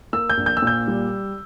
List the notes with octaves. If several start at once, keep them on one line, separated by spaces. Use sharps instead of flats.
A#3 E6
G6
A#1
G6
E6
A#2 G6
G3